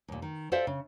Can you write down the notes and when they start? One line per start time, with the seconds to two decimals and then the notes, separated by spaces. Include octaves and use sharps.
0.08 D#2 A#2
0.22 D#3
0.52 A4 C5 D5 E5 F5 G5
0.67 C#3